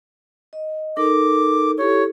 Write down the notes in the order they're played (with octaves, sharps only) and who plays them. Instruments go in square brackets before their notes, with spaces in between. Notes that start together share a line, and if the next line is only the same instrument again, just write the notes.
[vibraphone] D#5
[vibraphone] D#4 A4 A#4 [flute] D6
[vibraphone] E4 G4 A4 [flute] C#5